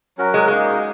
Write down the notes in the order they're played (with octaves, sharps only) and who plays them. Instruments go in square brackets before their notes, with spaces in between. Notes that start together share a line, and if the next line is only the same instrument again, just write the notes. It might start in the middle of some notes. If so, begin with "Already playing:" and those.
[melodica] F#3 C#4 F#4 A#4
[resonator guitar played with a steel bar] G#3
[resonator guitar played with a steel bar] G#3 [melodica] A#3 D#4 G#4